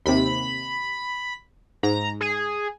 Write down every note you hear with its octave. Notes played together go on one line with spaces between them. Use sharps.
D#2 C3 B5
G#2 A#5
G#4